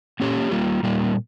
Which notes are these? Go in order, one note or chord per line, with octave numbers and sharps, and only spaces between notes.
A#3 C#4 G4 C#5
G3 A#3 F4
A#2 G3 A#3 F4